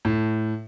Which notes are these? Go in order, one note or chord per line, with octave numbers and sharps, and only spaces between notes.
A2